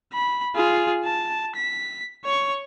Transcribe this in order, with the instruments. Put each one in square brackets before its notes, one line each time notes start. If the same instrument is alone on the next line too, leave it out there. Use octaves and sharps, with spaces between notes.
[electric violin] B5
F4 G#4
A5
B6
C#5 C#6